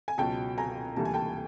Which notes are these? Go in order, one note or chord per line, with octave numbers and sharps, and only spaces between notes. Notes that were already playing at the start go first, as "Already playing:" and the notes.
G#5
C#2 B2 F#3 G5 A5
G#5 A#5
D2 C3 E3 G3 A#3 A5
G#5
G5 A5